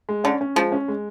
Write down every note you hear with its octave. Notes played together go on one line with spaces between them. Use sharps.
G#3
D3 C#4
C#4
F3 G#3
C#4
G#3